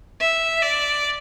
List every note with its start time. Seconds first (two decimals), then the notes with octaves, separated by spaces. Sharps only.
0.20 E5
0.62 D5